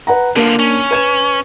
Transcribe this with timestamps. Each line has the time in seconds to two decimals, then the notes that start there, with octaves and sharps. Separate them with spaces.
0.07 B4 F#5 A#5
0.36 D3 A#3 D4 F4 A#4
0.59 C#4
0.91 B4 G#6 E7